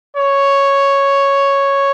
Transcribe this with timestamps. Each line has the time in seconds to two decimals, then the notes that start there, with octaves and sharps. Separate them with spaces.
0.17 C#5